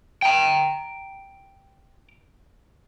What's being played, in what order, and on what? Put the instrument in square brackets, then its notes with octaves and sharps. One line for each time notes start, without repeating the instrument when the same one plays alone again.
[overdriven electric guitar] G5 A#5